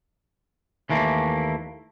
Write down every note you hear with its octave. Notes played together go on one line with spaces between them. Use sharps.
D#2 E3 A3 A#3